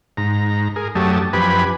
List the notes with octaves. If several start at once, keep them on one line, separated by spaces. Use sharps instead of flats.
G#2 A#5
G#4 A#4
F#2 F#3 A3 G4 A5 D#6
F#2 F3 G4 B4 G#5 B5